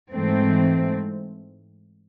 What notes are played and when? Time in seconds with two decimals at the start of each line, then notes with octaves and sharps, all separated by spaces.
0.12 G#2 E3 A3 C4